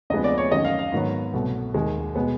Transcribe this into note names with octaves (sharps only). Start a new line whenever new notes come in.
D2 C3 F3 G#3 B3 D#5
D5
C#5
F#2 D#3 G#3 D#5
F5
F5
G#2 D#3 F#3 B3
C2 B2 F#3 A3
D#2 D#3 G#3
B2 G#3 B3